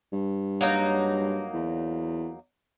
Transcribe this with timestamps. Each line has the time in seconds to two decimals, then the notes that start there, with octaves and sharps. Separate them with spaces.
0.12 G2
0.61 F#3 A#3 D#4
1.54 E2